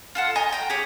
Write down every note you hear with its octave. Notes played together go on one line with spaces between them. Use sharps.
F4 A4 F#5
D#5 G#5 A#5
G5 A#5
G4 G#4 C#5 D6